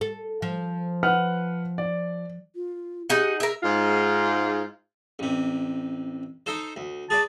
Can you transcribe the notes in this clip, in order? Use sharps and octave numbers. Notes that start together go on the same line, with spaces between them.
A4
F3
B4 F#5 F6
D5
F4
D#4 G4 G#4 F#5
G#4 A#4 E5
G#2 F4
A1 C3
D#4 A4 C5
D2
G#4 B4 D5 A5